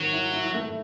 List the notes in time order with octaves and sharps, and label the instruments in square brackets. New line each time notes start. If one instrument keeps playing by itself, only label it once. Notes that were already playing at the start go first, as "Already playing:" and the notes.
Already playing: [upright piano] D#3 G3 C4 [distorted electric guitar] F#3
[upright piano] E4
E4
A3